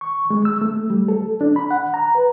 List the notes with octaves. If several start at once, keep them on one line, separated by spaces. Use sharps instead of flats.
C#6
G#3
E6
A3
G3
A4
D4
B5
F#5
A#5
B4